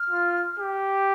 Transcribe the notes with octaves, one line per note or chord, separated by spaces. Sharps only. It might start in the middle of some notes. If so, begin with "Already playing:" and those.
Already playing: F6
F4
G4